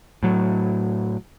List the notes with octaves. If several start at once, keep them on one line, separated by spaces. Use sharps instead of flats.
A2 F#3